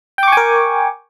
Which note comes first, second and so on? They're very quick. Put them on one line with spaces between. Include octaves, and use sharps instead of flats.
G5 D6 C#6 G#5 A#4